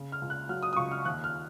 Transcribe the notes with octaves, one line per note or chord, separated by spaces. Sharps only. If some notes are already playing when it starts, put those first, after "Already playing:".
Already playing: C#3
F6
C#2
F#6
F#3 F6
D#6
D#6
C#2 C#6
F6
D#2 F#6
F6